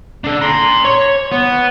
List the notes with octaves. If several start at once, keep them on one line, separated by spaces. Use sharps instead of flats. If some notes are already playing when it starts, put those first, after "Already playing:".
D4 A4
A#5 C6
C#5
B3